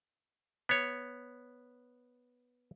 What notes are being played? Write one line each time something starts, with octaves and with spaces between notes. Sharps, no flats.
B3 C#5